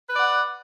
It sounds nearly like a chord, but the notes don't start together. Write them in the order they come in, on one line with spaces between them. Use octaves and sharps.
B4 D5 F#5